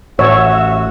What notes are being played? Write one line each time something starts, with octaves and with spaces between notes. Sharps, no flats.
A1 F#4 C#5 E5